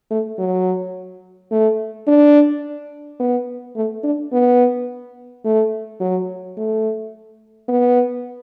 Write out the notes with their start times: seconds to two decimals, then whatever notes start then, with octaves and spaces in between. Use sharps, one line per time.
0.11 A3
0.39 F#3
1.51 A3
2.07 D4
3.20 B3
3.76 A3
4.03 D4
4.33 B3
5.45 A3
6.00 F#3
6.57 A3
7.69 B3